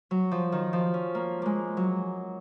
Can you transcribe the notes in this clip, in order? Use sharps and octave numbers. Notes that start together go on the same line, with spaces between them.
F#3
F3
D#3
F3
C#4
A#3
G#3 A#3
F#3